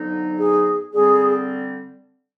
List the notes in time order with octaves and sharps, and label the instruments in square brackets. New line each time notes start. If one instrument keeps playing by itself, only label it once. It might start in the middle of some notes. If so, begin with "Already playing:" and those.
Already playing: [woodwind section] F2 D3 F#3 B3 D#4
[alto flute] G#4
[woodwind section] D3 G3 C4 [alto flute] G#4